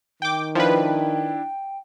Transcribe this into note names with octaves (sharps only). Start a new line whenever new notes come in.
D#3 G5 D6
F3 D4 E4 B4 G5